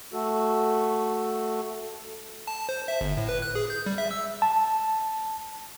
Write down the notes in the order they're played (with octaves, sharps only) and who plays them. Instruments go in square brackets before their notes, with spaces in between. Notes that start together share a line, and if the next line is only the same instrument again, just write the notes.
[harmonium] A3 F#4 A4
[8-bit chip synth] A5
C5
E5
G1
A2
B4
F#6
G#4
G6
G3
E5
E6
[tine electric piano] A5